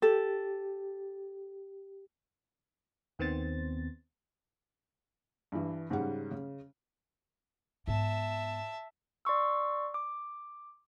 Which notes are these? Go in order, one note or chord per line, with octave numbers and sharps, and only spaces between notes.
G4 A4
D#2 D#3 B3 C4 C5 A6
G2 E3
G#2 C#3 G3 F#5
C#3
G#2 B3 E5 A5
D5 C6 C#6 E6
D6